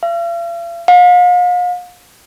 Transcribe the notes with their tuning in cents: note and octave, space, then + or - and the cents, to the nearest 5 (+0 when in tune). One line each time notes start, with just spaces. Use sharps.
F5 -45
F5 +40